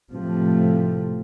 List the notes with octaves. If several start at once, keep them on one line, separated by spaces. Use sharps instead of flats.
A2 C3 F3 A3